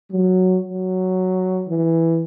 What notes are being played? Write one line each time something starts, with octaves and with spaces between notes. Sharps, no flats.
F#3
F#3
E3